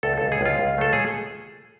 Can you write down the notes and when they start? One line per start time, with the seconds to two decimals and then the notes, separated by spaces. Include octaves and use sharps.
0.03 C#2 A4
0.18 C#2 A4
0.32 G#4
0.41 C#2 F4
0.59 C#2
0.78 A3 A4
0.93 G#4